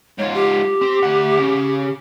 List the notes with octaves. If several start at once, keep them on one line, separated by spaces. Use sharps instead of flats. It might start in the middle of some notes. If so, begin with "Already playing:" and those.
G#2 F4 C#5
G4
C4
D2 F#5
C#3